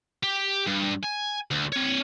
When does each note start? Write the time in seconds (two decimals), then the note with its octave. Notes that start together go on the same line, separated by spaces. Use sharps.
0.23 G4
0.67 G2
1.04 G#5
1.51 D2
1.72 C4 C#5